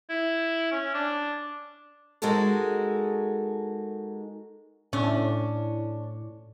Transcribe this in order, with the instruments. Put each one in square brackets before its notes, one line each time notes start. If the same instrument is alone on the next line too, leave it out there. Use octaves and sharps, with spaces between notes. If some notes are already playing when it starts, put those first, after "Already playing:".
[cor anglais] E4
C#4
D4
[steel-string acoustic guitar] G#3 D#4 F#4 A4 A#4
[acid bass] A2 [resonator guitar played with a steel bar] C#4 D4